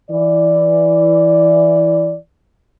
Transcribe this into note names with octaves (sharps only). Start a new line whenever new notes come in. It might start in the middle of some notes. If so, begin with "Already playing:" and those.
E3 D5